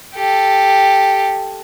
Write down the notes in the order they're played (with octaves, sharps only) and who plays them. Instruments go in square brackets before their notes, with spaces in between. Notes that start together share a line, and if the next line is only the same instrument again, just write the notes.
[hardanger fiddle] G4 A4